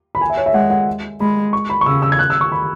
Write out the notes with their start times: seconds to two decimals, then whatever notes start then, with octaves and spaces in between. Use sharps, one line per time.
0.15 B5
0.21 G#5
0.30 E5
0.37 C#5
0.46 E5
0.54 G#3 F#5
0.71 F#5
1.20 G#3 B5
1.53 C#6
1.70 B5
1.81 C#6
1.86 C#3 E6
2.02 E6
2.12 G#6
2.19 F#6
2.30 E6
2.41 C#6
2.52 B5